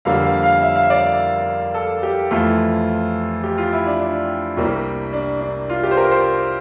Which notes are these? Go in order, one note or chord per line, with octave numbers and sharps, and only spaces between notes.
F2 D3 G3 A#3 F5
F5
F5
E5
F5
E5
D5
A4
G4
F2 E3 A3 F4
G4
F4
E4
D4
D4
C2 C3 G3 A#3
D4
D4
F4
G4
C5
A#4
C5